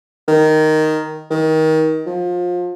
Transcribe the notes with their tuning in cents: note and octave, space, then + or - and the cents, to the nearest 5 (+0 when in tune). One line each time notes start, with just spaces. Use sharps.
D#3 +0
D#3 +25
F3 +25